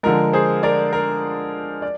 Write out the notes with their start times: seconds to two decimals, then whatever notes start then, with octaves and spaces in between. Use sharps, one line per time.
0.03 D3 F3 G#3 A#4
0.33 G#4 C5
0.63 A#4 D5
0.93 A#4
1.82 D5